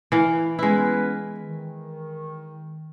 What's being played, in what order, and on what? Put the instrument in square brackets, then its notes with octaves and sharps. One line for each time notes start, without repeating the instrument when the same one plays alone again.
[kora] E3 F5
[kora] G#3 E4 [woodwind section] B3 C#4 B4
[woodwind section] D#3